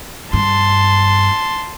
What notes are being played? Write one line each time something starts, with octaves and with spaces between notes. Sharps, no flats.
G2 A5 C6